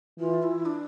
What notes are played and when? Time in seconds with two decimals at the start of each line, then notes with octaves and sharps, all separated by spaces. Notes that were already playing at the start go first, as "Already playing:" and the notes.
0.20 E3 F4
0.43 E4
0.66 D4